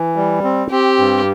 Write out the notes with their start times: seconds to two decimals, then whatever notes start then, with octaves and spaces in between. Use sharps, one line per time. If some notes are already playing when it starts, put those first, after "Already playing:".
Already playing: E3
0.16 G3
0.44 C4
0.71 C4 G4
0.99 G2